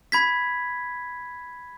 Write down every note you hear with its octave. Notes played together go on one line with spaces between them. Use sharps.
B5 G#6 B6